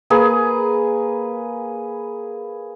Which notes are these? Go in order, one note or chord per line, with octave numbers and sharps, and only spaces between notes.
A#3 G#4 B4